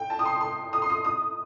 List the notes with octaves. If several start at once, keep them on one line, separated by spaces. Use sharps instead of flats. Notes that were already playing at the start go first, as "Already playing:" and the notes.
Already playing: G5
A5
D#6
C6
C6
D#6
C6
D#6
D#6